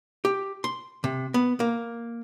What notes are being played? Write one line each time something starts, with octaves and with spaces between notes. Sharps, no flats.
G4
C6
C3
B3
A#3